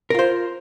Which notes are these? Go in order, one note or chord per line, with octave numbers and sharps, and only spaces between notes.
F4 A#4 C5